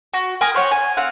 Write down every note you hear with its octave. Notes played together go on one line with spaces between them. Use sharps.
F#4
A#4 G5 G#5 D#6
C5 C#5 F#5
G#5
C4 F5 F#5